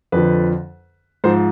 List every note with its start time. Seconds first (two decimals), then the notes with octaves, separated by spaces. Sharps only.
0.12 F2 D3 F3 B4
1.24 G#2 F3 C5